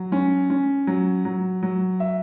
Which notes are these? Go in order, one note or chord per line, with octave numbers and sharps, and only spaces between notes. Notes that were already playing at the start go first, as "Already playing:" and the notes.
Already playing: F#3
C#4
C#4
F#3
F#3
F#3
E5